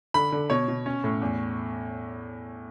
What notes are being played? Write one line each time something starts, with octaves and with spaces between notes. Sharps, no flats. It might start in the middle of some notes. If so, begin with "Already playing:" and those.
D3 B5
D3
B2 C#5
B2
C#4
A2
E2